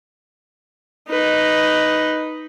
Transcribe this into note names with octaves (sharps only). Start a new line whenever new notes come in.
D#4 B4